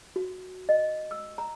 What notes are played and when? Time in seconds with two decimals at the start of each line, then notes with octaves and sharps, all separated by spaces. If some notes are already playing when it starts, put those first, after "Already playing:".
0.16 F#4
0.69 D#5
1.11 E6
1.38 A#5